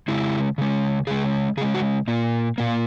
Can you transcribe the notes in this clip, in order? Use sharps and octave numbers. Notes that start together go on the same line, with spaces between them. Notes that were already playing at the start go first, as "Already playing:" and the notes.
C#3 G#3 E4
C#3 G#3
C#3 G#3 G#4
C#3 G#3 G#4
F#4
A#2 A#3
A#2 A#3